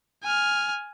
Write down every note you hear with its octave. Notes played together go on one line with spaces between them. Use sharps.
G#5 F6